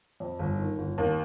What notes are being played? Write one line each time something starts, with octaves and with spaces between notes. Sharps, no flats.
F2
G1
D#3
G1
D#2